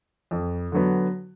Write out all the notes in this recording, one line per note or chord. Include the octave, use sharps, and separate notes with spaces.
F2
D3 F#3 B3